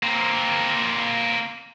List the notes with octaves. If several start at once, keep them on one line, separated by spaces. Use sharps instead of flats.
A#3 C4